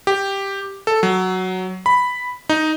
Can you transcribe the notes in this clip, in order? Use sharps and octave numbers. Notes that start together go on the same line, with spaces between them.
G4
A4
F#3
B5
D#4